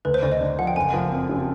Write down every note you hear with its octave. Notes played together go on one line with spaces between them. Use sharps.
D2 B4
C5
D2 D5
D#5
D3
F3 F#5
G5
F#1 G#5
F3
F2
C#3